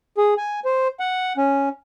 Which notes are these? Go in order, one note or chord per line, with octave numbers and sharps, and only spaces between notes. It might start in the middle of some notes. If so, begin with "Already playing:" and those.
G#4
G#5
C5
F#5
C#4